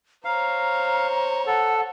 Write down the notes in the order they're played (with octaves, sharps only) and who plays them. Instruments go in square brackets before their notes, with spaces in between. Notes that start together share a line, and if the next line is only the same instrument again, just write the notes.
[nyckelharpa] C5 C#5 [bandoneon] F5 [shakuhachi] A#5
[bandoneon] A4 [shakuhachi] F#5